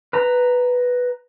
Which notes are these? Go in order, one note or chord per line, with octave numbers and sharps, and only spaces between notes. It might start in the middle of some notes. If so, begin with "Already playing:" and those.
B4 A#5